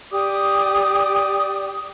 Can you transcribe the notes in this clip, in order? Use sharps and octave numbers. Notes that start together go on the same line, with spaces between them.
G4 D5 D6 D#6